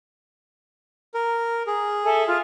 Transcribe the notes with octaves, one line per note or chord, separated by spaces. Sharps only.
A#4
G#4
A4 E5 G#5
F4 F6